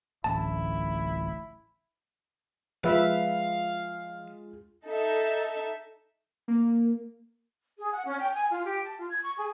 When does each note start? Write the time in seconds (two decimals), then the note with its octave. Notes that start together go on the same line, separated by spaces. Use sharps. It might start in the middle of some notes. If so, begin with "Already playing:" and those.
0.24 D1 A1 E4 A5
2.84 F3 G#3 F4 B4 E5 F5
4.85 D#4 A4 E5
6.48 A#3
7.78 G#4
7.92 F#5
8.06 C#4
8.19 G5
8.33 G#5
8.50 F4
8.65 G4
8.84 A5
8.97 F4
9.09 G#6
9.23 C#6
9.37 G#4